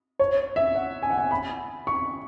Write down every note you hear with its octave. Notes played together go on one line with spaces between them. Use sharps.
C#5
E5
F#5
G#5
F#5
G#5
B5
C#6